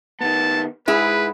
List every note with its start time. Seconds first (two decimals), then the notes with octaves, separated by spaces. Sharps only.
0.21 D#3 B3 A5
0.88 G#2 E4 G#4 B4